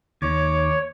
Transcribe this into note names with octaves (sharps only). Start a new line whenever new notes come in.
D#2 C#5 D6